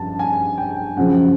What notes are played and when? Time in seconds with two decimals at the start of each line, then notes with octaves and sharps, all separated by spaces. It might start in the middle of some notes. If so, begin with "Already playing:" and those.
Already playing: G2 F3 C#4 A5
0.19 G#5
0.58 G5
0.97 F#2 C#3 F3 F#5